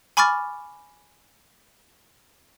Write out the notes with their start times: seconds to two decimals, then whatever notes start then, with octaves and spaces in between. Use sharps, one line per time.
0.17 G#5 B5 C#6 D6 F6 A6